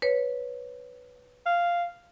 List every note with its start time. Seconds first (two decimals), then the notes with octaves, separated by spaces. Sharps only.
0.02 B4 C#5
1.46 F5